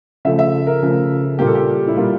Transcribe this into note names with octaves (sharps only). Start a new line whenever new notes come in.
C#3 F3 A3 E5
E5
A#4
C#3 F3 A3
A#2 G3 A#3 G4
A4
G4
E4
A#2 G3 A#3 F4